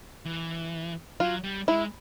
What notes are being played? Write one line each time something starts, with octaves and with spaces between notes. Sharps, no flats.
E3
F#3 F4
G3
G#3 E4